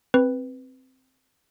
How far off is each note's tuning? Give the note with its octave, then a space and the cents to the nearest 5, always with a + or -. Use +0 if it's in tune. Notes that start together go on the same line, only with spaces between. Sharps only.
C4 +0 B4 +0